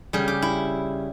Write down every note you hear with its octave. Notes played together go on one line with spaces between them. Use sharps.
C#3 G3 G#4
G4
E4